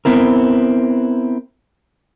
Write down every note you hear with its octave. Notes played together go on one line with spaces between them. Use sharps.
B3 C4 E4 A#4